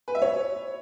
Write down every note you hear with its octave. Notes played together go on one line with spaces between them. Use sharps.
B4
E5
C#5